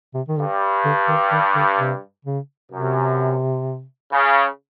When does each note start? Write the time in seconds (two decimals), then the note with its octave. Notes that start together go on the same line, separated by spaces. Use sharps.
0.15 C3
0.29 D#3
0.38 G2 D3
0.85 D3
1.08 D#3
1.32 D#3
1.55 D3
1.79 C3
2.25 C#3
2.71 F#2 C3
4.12 C#3